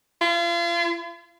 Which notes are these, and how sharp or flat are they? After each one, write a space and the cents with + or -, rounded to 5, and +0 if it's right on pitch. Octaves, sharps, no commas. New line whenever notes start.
F4 -35